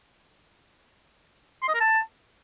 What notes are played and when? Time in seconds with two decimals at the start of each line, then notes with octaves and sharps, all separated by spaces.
1.62 C6
1.68 D#5
1.74 A#4
1.80 A5